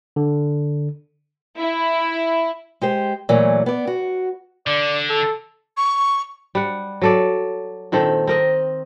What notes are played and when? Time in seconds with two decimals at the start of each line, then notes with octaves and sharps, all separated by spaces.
0.16 D3
1.58 E4
2.81 G#3 G4 C5
3.29 A#2 E3 F#3 A3
3.66 B3 D5
3.87 F#4
4.67 D3 D5
5.10 A4
5.77 C#6
6.55 G3 F#5
7.02 F#3 A4 D5
7.92 A#2 D#3 C4 A4
8.28 C4 A#4 D#5